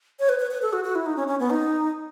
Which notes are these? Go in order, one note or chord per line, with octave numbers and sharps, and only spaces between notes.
C#5
B4
B4
B4
A4
F#4
F#4
E4
D#4
C#4
C#4
B3
D#4